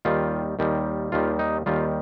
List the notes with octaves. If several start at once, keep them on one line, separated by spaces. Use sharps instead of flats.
D#2 D#3 G3 F4
D#2 D#3 G3
D#2 D#3 G3 F4
D#4
D#2 D#3 G3 F4